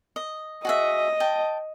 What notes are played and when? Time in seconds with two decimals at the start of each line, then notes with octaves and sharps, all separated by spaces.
0.16 D#5
0.65 F#4 G#4 D#5 E5
1.20 G5 A5